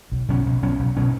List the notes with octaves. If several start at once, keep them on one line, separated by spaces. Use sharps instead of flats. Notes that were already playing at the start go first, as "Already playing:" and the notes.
B1
B2 F#3 C#4
B1
B2 F#3 C#4
B1
B2 F#3 C#4